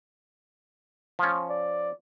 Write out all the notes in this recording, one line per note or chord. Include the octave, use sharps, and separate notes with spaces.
F3 C#4
D5